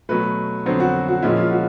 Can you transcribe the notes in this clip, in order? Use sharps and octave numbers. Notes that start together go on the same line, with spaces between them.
B2 F#3 A3 B4
F2 D3 F#3 B3 C5
F#4
F#4
A#2 F3 G#3 C#4 E4
F4
F#4